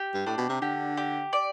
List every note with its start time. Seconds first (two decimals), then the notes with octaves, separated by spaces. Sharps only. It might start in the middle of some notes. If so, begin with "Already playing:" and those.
Already playing: G4
0.14 G2
0.26 A2 D4
0.38 B2
0.49 C3
0.62 D3 G4
0.97 G4
1.33 D5